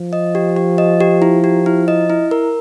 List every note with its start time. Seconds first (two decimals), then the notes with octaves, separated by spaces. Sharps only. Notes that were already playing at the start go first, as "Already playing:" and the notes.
Already playing: F3
0.13 D#5
0.35 G4
0.56 G4
0.78 D#5
1.00 G4
1.22 E4
1.44 G4
1.66 E4
1.88 D#5
2.10 E4
2.31 A#4